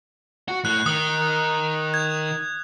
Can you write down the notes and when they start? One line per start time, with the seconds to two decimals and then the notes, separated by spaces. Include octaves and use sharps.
0.48 F#4
0.65 A2 F#6
0.86 D#3 D#6
1.94 G#6